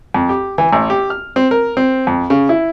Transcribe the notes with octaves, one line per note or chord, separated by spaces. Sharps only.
F2
G4
E3
A1
G4
F6
C4
A#4
C4
F2
C#3
E4